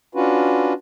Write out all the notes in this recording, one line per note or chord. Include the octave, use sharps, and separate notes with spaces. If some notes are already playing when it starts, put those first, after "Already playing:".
C#4 D4 F4 F#4 B4